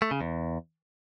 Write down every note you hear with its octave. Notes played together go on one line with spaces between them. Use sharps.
A3
C#3
E2